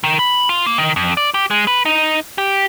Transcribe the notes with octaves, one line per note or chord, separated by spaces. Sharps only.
D#3
B5
F4
A#3
D#3
F2
D5
G4
G#3
B4
D#4
G4